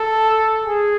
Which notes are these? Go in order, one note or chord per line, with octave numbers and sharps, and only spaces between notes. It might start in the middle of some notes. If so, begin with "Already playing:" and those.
Already playing: A4
G#4